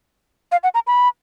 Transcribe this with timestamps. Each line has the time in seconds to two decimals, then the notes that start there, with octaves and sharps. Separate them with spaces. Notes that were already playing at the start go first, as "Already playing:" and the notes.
0.52 F5
0.63 F#5
0.74 A#5
0.87 B5